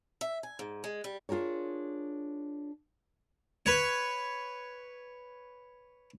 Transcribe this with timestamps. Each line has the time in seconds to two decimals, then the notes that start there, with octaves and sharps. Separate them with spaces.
0.21 E5
0.43 G#5
0.59 G#2
0.84 G#3
1.04 G3
1.29 D4 F4 G#4 A#4 C#5
3.66 B4 C#5